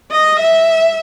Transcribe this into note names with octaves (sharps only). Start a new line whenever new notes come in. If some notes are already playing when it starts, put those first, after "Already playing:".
D#5
E5